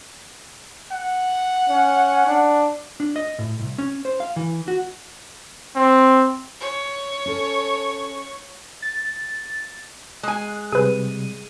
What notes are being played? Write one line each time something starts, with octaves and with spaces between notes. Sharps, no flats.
F#5
C#4
D4
D4
D#5
A2
C2
C#4
C5
F5
E3
F#4
C4
C#5
C#4 A4
A6
G#3 G#5 F#6
C3 G3 G#4 B4 D#7